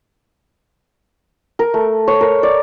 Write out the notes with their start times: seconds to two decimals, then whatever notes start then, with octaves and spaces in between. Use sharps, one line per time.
1.59 A#4
1.74 A3
2.08 C#5
2.21 A#4
2.43 D5